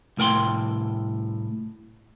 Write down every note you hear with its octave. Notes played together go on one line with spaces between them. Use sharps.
C2 A2 A#4 G5 C6